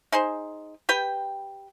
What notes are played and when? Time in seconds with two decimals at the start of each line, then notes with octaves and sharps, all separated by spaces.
0.12 D#4 G#4 C5
0.89 G4 B4 G5